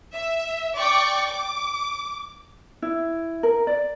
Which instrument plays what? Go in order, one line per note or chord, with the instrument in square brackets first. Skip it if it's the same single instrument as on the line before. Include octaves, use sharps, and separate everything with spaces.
[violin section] E5
D5 G5 C#6 D6
D6
[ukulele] E4
A#4
D5